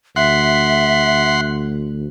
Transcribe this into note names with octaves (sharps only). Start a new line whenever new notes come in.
D2 E5 F#5 C6